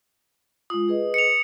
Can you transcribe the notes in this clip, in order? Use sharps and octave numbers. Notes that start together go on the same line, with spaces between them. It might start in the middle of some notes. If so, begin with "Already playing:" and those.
G#3 F4 D#6
G#4 B4 D#5
C#7 F7